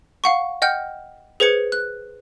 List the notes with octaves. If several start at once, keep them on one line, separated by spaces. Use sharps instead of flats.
F5 F#5 C#6
D#5 F#5 G5 F6 G6
G#4 B4 C5 G#6 C#7
F#6